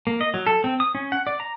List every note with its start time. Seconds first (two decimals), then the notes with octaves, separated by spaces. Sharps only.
0.07 A#3
0.21 D#5
0.34 F#3
0.47 A4
0.64 C4
0.80 D#6
0.95 C#4
1.12 F#5
1.27 D5
1.40 A#5